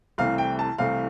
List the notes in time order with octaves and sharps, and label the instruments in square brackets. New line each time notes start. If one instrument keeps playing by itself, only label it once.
[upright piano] C2 C3 E3 A3 F5
G5
A5
C2 C3 E3 A3 F5